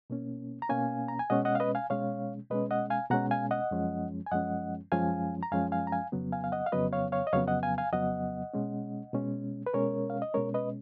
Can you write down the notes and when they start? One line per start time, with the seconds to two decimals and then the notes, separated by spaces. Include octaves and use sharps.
0.10 B2 A#3 C#4
0.62 A#5
0.69 B2 A#3 C#4 F5 G#5
1.08 A#5
1.19 G#5
1.30 B2 G#3 C#4 D#5 F#5
1.45 D#5 F#5
1.55 F5
1.60 B4 D#5
1.75 F5 G#5
1.90 B2 G#3 C#4 C#5 F5
2.51 B2 G#3 C#4 B4 D#5
2.71 D#5 F#5
2.90 F5 G#5
3.11 B2 G#3 C#4 F#5 A#5
3.31 F5 G#5
3.51 D#5 F#5
3.71 F#2 F3 G#3 C#4
4.26 G#5
4.31 F#2 F3 G#3 C#4 D#5 F#5
4.92 F#2 F3 G#3 C#4 F5 G#5
5.43 A#5
5.52 F#2 F3 G#3 C#4 F5 G#5
5.72 F5 G#5
5.87 A#5
5.92 F5 G#5
6.12 F2 C#3 F#3 B3
6.32 F5 G#5
6.44 F5
6.52 D#5 F#5
6.66 F5
6.72 F2 C#3 F#3 B3 B4 D#5
6.93 C#5 F5
7.12 C#5 F5
7.27 D#5
7.33 F2 C#3 F#3 B3 C#5 F5
7.48 D#5 F#5
7.63 F5 G#5
7.78 F5 G#5
7.93 F2 C#3 F#3 B3 D#5 F#5
8.54 B2 G#3 C#4
9.13 B2 G#3 C#4
9.66 B4
9.74 B2 G#3 C#4 A#4 C#5
10.10 F5
10.22 D#5
10.34 B2 G#3 C#4 A#4 C#5
10.54 B4 D#5